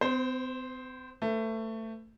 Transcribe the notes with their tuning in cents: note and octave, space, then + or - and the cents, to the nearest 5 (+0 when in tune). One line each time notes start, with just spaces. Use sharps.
C4 -45 C5 +0
A3 +20 B4 +35